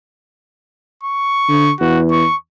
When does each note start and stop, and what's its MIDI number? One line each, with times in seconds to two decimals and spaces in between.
1.03 1.74 85
1.49 1.69 50
1.80 2.23 40
1.80 2.00 66
2.11 2.36 85